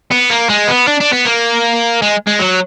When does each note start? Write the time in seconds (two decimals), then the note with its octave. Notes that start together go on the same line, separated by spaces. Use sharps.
0.11 B3
0.31 A#3
0.50 G#3
0.68 B3
0.88 D4
1.01 D4
1.13 B3
1.25 A#3
2.02 G#3
2.27 G#3
2.39 F#3